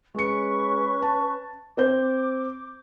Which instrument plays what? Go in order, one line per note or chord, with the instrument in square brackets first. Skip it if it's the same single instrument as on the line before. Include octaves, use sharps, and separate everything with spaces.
[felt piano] G#3 C#7 [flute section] C#4 B4 C#6
[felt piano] A5
[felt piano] C4 C5 G6 [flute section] D6